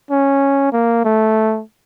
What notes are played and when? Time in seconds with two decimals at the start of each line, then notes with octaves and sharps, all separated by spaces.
0.10 C#4
0.72 A#3
1.05 A3